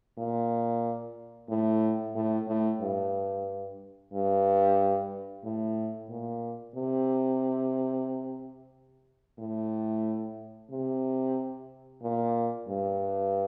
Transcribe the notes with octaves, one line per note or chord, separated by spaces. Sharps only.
A#2
A2
A2
A2
G2
G2
A2
A#2
C3
A2
C3
A#2
G2